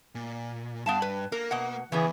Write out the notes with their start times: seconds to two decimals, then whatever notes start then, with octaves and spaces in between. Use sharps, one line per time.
0.15 A#2
0.86 G2 B3 F5 A5
1.02 B4
1.32 A#3 A#4
1.51 B2 F#5
1.92 E2 C#3 E3 B3 G#4